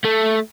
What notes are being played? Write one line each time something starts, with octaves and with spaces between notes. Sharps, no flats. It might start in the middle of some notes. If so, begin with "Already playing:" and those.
A3